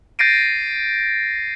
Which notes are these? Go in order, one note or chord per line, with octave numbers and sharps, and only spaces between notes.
G6 A6 A#6 C7 D7 D#7